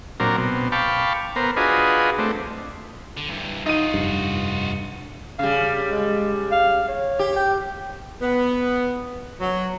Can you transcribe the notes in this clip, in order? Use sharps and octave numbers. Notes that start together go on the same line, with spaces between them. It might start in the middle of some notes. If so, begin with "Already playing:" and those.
A#2 F#3 C4 D4 A#4
B2 C4
F5 G5 A5 B5 C#6 D6
B3 A#4 C5
D4 F4 F#4 G#4 B4 D#5
A3 C4 D4
D3
G2 E3
D#4 F4 F#4 D#7
F1 G2
C#3 G3 F5
G#3
F5
C#5
G4
G5
B3
F#3